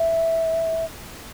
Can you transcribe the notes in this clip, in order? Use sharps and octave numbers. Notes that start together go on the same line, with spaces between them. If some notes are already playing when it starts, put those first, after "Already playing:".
Already playing: E5